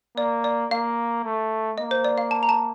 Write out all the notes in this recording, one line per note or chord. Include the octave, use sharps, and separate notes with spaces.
A#3 D5
D5
A#3 F5
A3
A#3 D#5
C5
D5
F5
A5
A#5
A5